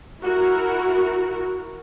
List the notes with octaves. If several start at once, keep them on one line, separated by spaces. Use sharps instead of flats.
E4 F#4 A#4